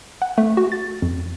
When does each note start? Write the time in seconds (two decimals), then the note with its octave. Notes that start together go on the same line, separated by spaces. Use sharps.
0.22 F#5
0.38 A3
0.57 F#4
0.72 A6
1.02 F2